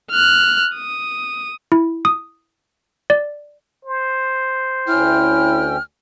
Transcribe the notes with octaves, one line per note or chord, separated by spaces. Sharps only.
F6 F#6
D#6
E4
D#6
D5
C5
D2 C#4 E4 G5 F6